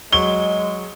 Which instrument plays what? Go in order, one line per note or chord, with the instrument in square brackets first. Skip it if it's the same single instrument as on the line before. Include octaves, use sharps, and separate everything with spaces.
[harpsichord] F#3 [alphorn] G#3 [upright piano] G7